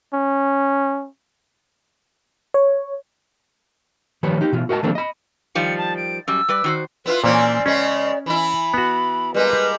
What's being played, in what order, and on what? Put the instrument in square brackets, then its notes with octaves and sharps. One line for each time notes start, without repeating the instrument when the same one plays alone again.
[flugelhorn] C#4
[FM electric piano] C#5
[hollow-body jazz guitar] D#3 F3 G3 B4 C#5
D#4 G4
B2 E3 F4
F#4 A#4 D#5 F5 A5
D#3 F3 A#3 C4 D4 A4
D#5 B5
[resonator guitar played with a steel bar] D#3 F3 G3 [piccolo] C#7
[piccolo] A5
D7
[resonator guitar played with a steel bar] F#2 G3 [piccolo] E6
[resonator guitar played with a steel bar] G3 B4 D5
D#3 F#4 C5
[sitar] B3 E4 F4 [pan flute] B4
[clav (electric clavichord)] A#2 A#3 [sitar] E3 C4 C#4 [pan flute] D5
[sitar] C#3 G#3 B3 [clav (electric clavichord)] C#4
[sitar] E3 E4 [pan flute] B5
[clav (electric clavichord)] B3 F#4
[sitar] G3 G#3 A#3 [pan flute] B4